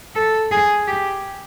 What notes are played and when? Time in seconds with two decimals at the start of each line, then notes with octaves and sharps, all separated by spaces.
0.15 A4
0.52 G#4
0.88 G4